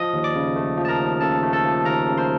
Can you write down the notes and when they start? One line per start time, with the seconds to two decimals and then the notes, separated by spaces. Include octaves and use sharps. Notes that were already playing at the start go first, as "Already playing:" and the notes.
Already playing: F3 D#5 D#6
0.13 D#2
0.24 D5 D6
0.35 C#3
0.56 A3
0.77 F3
0.85 A5
0.88 A#4 A#5
0.99 D#2
1.21 C#3 A4 A5
1.43 A3
1.53 A4 A5
1.64 F3
1.85 D#2 A#4 A#5
2.08 C#3
2.18 C5 C6